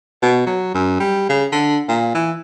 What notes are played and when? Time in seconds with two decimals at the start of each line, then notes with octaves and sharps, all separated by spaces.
0.22 B2
0.46 F#3
0.74 F#2
1.00 G3
1.29 C#3
1.52 D3
1.89 A#2
2.15 E3